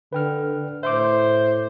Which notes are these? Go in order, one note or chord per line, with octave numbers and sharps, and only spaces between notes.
D3 B4 G5 F6
A2 C5 E5 C6 D6